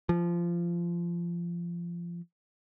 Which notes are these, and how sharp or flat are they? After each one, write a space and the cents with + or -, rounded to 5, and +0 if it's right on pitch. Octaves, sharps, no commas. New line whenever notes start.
F3 -20